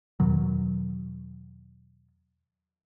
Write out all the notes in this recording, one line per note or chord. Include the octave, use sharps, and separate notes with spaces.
E2 B2 D#3 F#3